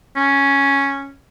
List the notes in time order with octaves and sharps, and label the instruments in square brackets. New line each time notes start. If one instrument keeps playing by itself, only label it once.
[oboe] C#4